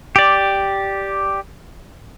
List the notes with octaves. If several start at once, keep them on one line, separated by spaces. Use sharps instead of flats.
G4 D5